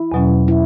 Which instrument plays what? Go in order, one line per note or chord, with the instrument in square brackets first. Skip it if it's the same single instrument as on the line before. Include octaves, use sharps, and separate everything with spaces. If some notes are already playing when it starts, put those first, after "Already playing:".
Already playing: [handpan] E4
[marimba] E2 B2 F#3 C#4
[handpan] E4